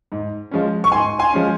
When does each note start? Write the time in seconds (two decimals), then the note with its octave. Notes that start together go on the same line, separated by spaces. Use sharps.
0.12 G#2
0.51 F3 G#3 C#4
0.84 C#6
0.92 G#2 G#5 C6
1.19 G#5 C6
1.33 F3 G#3 C#4